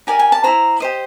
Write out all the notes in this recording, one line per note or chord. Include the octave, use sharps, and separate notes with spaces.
D#4 G4 A#4 D5 G#5
G#5
A5
E4 G#4 C5 A#5
G4 C5 D#5